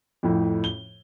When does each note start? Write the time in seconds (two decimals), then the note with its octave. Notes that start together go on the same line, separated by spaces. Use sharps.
0.23 F2 A2
0.64 G7